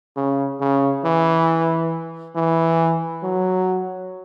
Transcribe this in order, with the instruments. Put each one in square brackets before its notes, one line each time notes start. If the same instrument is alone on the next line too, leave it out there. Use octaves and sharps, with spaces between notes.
[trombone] C#3
C#3
E3
E3
F#3